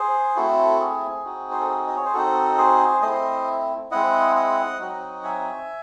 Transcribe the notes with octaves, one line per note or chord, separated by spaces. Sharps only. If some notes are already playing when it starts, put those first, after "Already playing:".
Already playing: G#4 C5
A3 C4 E4 F#4 A4
G#4
C4 D#4 F#4
C5
A4
G#4
D#5
C#5
C5
C4 D#4 F#4 A4
G#4 C5
A3 C4 E4 C5 D#5
G#3 C4 E4 D#5 F#5
D#5 F#5
F#3 C4 D#4 F#4
E5 G#5